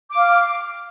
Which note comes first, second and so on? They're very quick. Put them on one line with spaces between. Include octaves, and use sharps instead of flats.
D6 F5 F6